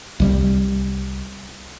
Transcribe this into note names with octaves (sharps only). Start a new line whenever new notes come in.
C2 G3